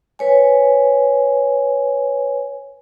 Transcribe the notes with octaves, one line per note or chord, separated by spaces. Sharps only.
B4 C#5 G#5